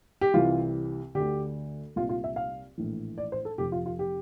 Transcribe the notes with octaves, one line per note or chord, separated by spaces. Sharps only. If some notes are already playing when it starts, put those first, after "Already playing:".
G4
C2 C3 E3 F4
D2 D3 G4
C2 A#2 F4
F4
E5
F5
A#1 A2 E3
D5
C5
A4
F1 F2 C3 G4
F4
F4
G4